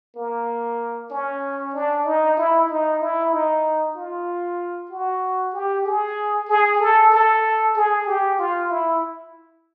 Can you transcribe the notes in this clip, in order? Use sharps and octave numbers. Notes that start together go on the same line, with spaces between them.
A#3
C#4
D4
D#4
E4
D#4
E4
D#4
F4
F#4
G4
G#4
G#4
A4
A4
G#4
G4
F4
E4